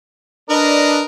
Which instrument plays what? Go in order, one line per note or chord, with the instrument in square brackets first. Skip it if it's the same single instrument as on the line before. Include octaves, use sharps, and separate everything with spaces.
[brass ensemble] D4 [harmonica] A#4 B4 D#5